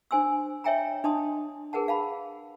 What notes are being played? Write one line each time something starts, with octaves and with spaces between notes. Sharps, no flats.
D4 C5 G#5 C6 E6
C#5 D#5 E5 G5 G#5 A#5
D4 D#5 A5 C6 D#6
G#4 A#4 B4 F#5 A5
F5 A5 B5